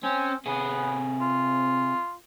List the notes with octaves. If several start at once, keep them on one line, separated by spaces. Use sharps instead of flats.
C4 C#4
C3 B3 G#4
F4